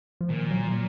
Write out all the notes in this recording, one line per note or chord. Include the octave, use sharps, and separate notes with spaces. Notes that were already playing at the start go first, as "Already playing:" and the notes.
F3
A#2 D#3
F#3
A#2